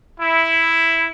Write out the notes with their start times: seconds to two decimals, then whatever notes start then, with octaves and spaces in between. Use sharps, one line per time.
0.18 E4